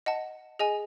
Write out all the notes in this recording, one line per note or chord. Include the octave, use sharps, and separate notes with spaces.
D#5 F#5 A5
G#4 D#5 G#5